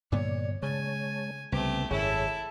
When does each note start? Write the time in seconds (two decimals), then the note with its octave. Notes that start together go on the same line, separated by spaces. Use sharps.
0.12 G2 A#2 D3 B3 C#5 D5
0.62 C#3 G#3 C#5 G#5 A5
1.52 C2 C#3 A3 B3 C4 G4
1.91 G#1 F#2 E4 G#4 A4 C#5